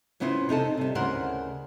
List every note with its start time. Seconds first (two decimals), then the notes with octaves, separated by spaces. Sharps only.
0.20 C#3 B3 C#4 E4 F4 C5
0.49 C3 D#4 A4 A5
0.77 C3 G3
0.95 D2 C#3 E4 A#4 C5 F#5